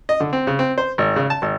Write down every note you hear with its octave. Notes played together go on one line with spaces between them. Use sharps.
D#5
D3
C4
C#3
C4
C5
G#1
C#3
A5
G#1